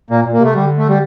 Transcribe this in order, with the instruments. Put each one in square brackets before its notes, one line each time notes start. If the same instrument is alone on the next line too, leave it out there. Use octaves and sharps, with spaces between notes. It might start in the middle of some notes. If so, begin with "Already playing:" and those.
[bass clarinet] A#2 [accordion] A#3
[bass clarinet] A#2
[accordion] A#3
[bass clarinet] C3 [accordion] A3
[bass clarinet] D3 [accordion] G3
[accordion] A3
G3